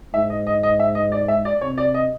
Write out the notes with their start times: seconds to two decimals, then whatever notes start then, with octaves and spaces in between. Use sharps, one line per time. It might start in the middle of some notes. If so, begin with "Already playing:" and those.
0.14 G#2 E5
0.30 D#5
0.47 D#5
0.63 D#5
0.79 E5
0.95 D#5
1.12 D5
1.28 E5
1.45 D5
1.61 C3 C#5
1.78 D5
1.94 D#5